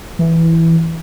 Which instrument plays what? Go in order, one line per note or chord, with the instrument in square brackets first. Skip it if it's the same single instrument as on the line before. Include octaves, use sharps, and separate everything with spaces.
[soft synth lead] E3